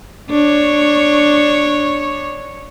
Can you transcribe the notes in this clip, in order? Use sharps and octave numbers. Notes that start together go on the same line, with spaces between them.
D4 C#5